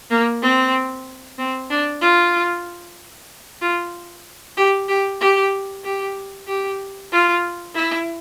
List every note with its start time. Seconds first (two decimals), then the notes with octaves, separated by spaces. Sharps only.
0.11 A#3
0.42 C4
1.38 C4
1.70 D4
2.02 F4
3.61 F4
4.57 G4
4.89 G4
5.21 G4
5.84 G4
6.47 G4
7.12 F4
7.75 E4